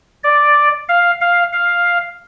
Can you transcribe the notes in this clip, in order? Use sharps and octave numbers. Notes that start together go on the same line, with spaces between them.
D5
F5
F5
F5